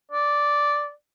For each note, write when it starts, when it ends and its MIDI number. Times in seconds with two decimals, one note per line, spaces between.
0.11 0.90 74